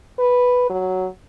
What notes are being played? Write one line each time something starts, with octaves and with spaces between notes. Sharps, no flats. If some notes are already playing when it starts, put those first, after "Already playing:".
B4
F#3